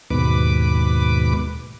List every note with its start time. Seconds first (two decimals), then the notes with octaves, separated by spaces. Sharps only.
0.10 D#2 G#2 B2 B4 D6